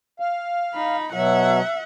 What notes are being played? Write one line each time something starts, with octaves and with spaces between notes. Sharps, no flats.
F5
D#4 B5
B2 F#3 E5 F#5